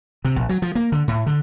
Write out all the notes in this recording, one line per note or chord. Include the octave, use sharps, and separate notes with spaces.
C3
A#1
F#3
F3
A#3
D3
A2
D3